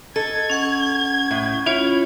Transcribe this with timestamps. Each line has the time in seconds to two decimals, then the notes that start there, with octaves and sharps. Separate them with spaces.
0.16 A4 D#5 G#6
0.50 C#4 F#5 C#6
1.31 A2
1.66 C#4 E4 F4 C#5